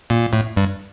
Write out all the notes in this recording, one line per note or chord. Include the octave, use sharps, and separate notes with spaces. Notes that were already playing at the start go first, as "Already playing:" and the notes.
A#2
A2
G2